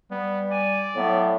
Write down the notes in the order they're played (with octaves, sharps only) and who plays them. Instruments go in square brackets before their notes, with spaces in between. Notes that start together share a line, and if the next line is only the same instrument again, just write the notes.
[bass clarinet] G3 [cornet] B3
[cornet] D5 [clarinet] G#5
[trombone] A2 [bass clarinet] F#3 [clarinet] B3